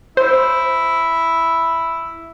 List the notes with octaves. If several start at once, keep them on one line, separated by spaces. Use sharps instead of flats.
E4 C5